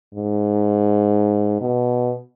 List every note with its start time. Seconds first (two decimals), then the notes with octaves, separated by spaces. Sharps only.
0.15 G#2
1.61 B2